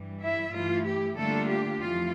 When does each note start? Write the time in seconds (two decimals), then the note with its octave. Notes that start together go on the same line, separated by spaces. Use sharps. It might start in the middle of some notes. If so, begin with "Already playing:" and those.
Already playing: G2 E3 G3
0.20 E4 E5
0.53 G2 E3 A3 E4 F4
0.85 G4
1.17 D3 G3 A3 A#3 D4 F4 A4
1.50 G4
1.82 F2 E3 A3 F4